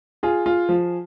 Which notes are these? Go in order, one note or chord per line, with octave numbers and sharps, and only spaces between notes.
F4 G#4
F4
F3